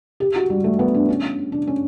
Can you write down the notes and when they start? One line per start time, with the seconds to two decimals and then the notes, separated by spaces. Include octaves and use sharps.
0.20 G4
0.36 F#4
0.50 G3
0.64 A3
0.79 B3
0.94 D4
1.09 C#4
1.52 D4
1.67 C#4